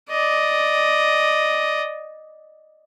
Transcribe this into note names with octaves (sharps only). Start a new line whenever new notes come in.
D5 D#5